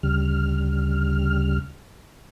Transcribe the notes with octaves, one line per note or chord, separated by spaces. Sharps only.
D2 C#3 G3 F6